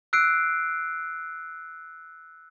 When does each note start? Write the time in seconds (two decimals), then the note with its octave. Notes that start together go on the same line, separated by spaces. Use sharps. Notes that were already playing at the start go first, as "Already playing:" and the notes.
0.13 E6 F#6 C7 D7